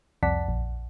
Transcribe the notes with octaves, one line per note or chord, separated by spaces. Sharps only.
C2 F2 D5 F#5 A5 B6
A#1